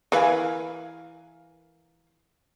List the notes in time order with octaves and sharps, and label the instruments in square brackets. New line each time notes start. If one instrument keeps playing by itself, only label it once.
[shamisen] E3 B4 [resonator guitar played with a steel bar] A#4 F5 G#5